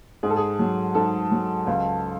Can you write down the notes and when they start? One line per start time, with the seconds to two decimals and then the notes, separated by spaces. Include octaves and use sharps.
0.23 G#2 G#4
0.30 A4
0.37 G#4
0.59 F#3
0.95 G#2 A4
1.31 F#3
1.67 C#2